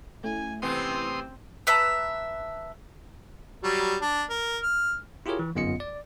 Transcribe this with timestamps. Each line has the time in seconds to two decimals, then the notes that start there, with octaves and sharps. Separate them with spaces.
0.24 A3 C#4 E4 G#5
0.62 C3 E3 B3 C4 C6 D#6
1.67 B4 E5 A5 A#5
3.64 F#3 G3
4.01 D4
4.30 A#4
4.63 F6
5.26 E4 F4 G4 G#4 A#4 C#5
5.39 E3
5.55 G1 F#2 B3 F4 D#5 C#7
5.80 D5